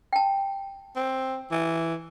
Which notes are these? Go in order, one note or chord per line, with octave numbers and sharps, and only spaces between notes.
G5 A5
C4
E3